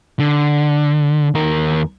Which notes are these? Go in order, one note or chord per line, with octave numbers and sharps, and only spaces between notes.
D3
D#2 A#4